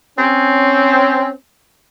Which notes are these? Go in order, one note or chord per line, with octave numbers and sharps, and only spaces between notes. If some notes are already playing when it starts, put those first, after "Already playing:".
C4 C#4